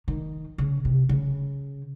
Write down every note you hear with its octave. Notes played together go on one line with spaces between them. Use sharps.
D#3
C#3
C3
C#3